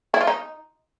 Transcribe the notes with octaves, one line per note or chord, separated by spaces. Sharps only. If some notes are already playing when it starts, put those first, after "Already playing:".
E4
F4
D#4